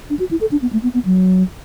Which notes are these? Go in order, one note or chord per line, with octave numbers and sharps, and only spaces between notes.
D4
F#4
E4
A4
D4
B3
A3
B3
B3
F#3